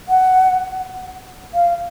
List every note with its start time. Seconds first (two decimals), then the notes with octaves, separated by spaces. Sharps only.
0.09 F#5
1.54 F5